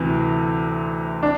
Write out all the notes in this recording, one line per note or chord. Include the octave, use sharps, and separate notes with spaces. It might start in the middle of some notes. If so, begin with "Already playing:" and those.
Already playing: D2 C3 E3
D4